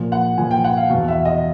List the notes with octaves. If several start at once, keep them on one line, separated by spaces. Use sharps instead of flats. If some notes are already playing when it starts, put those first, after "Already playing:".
Already playing: A#2 F3
F#5
A#2 F3 G#5
G5
F#5
F5
E2 B2 F5
E5
D#5